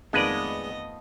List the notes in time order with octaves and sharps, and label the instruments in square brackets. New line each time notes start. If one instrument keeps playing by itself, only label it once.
[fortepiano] F2 D#3 [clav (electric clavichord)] G#3 B4 D5 [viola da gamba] A3 B3 D#5